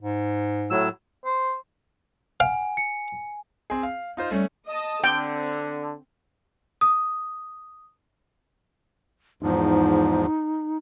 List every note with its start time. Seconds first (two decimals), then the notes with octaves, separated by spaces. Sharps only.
0.01 G#2
0.70 A2 F#3 E6
1.25 C5
2.40 F5 F#5 G#5
2.77 C#7
3.70 C4 G#4
3.83 F5
4.17 D#4 F4 C5
4.31 G3 A3 C#4
4.67 D#5 A5 D#6
5.04 D3 C4 G5
6.81 D#6
9.43 E2 G#2 F3 D#4